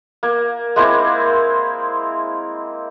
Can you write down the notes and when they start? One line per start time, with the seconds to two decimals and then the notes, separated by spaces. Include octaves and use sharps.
0.23 A#3
0.76 G#3 A#3 C4 E4